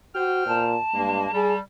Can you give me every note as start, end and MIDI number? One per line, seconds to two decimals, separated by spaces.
0.15 0.46 66
0.15 0.68 72
0.15 0.68 79
0.15 0.68 89
0.47 0.76 46
0.47 1.56 81
0.94 1.27 43
0.94 1.28 56
0.94 1.28 58
1.33 1.60 55
1.33 1.54 68